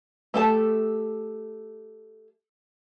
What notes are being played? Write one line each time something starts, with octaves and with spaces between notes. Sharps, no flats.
A3 G4 A4 C5 A5